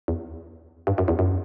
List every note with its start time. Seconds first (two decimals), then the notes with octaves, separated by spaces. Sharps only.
0.08 E2
0.87 G2
0.98 F#2
1.08 E2
1.19 F#2